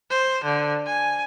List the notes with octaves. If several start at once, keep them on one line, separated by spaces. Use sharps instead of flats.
C5
D3
G#5